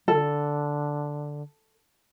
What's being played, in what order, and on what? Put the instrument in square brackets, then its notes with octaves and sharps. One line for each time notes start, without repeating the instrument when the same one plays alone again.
[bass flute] D3 [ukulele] A4